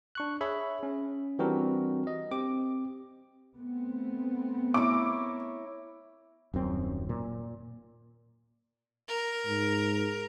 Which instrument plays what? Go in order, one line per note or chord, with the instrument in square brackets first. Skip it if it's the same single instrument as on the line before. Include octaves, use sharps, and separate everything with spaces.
[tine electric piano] D4 C#6 F#6
G#4 C#5 E5 B5
C#4
E3 G3 C4 D4 F#4 A#4
D#5
C4 G4 D6
[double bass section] A3 B3 C4
[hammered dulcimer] E4 A#4 C#5 [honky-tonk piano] D6
[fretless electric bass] D#1 F#2 C4
A#2
[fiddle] A#4
[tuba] G#2